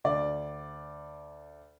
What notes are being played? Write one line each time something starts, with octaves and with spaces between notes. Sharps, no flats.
D2 D5